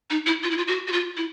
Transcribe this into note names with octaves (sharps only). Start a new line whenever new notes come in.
D#4
E4
F4
E4
F4
F#4
F#4
F4
E4